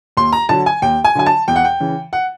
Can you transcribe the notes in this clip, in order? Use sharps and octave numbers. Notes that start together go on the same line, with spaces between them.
D#2 C6
A#5
D3 F#3 A5
G#5
D#2 G5
G#5
D3 F#3 G#5
A5
E2 G5
F#5
G5
C#3 E3
F#5